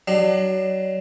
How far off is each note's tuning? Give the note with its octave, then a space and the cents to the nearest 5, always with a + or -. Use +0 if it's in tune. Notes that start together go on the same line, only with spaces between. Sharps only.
F#3 +30 D4 +30